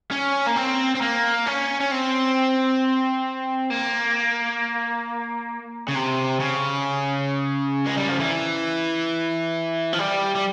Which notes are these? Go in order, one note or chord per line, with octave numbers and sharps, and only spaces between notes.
C#4
A#3
C4
C4
A#3
C#4
C#4
C4
A#3
C#3
C3
C#3
G#3
G3
F3
E3
F3
G3
G3